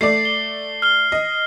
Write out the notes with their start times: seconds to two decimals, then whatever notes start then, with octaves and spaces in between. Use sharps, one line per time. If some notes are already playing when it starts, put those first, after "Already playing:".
0.01 A3 D5 C7
0.25 G7
0.82 F6 G7
1.12 D#5